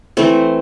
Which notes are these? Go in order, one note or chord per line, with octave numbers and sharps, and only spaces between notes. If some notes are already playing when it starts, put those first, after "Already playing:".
E3 A3 C4